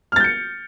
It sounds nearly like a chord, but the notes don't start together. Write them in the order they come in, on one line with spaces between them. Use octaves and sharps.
F6 A6 G6 C#7